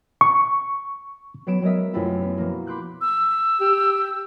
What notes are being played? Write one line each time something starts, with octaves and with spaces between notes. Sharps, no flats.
C#6
F#3 B3 C#4 D7 E7
F#3 G#3 B3 A#4 D#5 E5
F#2 C3 A3 B3 E4 F4
B3
B2 F3 A#3
B5 C6 D6 F#6 G6
E6
G4